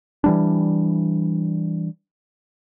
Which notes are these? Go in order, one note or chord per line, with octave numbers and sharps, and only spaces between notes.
E3 G3 D4